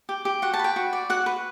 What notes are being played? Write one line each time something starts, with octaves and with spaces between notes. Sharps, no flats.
G4
G4
F#4 F#5
A5
B4 G5
F#4
D5
F#4 F#5
B4